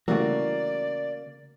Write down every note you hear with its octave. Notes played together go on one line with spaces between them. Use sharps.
C#3 E3 G3 A3 A#3 F#4 D5